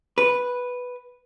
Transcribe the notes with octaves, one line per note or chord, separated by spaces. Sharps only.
B4